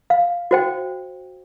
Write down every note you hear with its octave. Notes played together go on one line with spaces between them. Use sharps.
F5
F#4 C5 G5